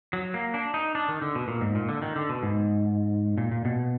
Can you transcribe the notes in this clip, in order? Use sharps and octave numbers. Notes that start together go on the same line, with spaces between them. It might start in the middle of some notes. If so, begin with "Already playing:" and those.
F#3
A#3
D4
D#4
D4
D#3
D3
B2
A#2
G#2
A#2
D3
D#3
D3
B2
G#2
A#2
A#2
B2